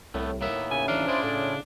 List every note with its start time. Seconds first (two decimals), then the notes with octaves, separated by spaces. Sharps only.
0.14 C2 A2 A3 B3
0.41 D#2 A2 A#3 B3 E5
0.71 C#3 G#5
0.88 E3 D4 D#4 F5
1.07 E4 F4 G#4 C5 D5
1.23 A2